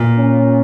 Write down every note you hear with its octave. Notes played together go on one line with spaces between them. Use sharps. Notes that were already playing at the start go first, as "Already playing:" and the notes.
Already playing: A#2
C#4